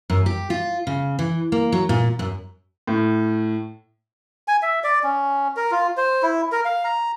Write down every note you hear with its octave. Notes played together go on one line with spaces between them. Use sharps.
F#2
G4
F4
C#3
E3
A#3
F#3
A#2
F#2
A2
G#5
E5
D5
C#4
A#4
F4
C5
E4
A#4
F5
A#5